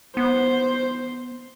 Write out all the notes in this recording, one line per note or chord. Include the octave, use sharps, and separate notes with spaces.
B3 C5